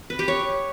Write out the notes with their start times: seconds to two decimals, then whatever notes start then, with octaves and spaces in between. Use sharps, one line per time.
0.10 B4
0.19 G4
0.28 C#5